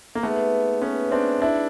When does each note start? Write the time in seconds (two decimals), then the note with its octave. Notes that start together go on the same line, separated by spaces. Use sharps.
0.15 A#3
0.23 A3 B3 D#4 G#4 B4 E5
0.82 B3 C#4
1.12 C4 D4
1.42 D4 E4